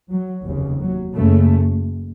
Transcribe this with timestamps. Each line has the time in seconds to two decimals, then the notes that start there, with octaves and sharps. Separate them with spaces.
0.10 F#3
0.45 F1 D#2 C#3
0.81 F#3
1.16 F#1 F#2 C#3 A3